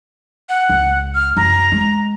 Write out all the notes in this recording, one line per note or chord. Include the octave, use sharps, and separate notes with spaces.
F#5
C#2
F6
F#2 A#5
G#3